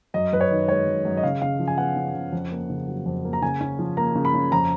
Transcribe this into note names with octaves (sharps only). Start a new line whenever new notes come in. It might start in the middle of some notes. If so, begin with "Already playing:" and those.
F#2 D#5
F#2 B4
C#5
D#3
G#3 C#5
F#2
F#2
D#5
C#3 F5
C#3 F5
F3
G#5
B3 F#5
C#3
C#3
F2
A#3
C#3
F#3
F2
A#3
A#5
C#3 G#5
C#4
F3
A#3 A#5
C#3
B5
C#4
F2 A#5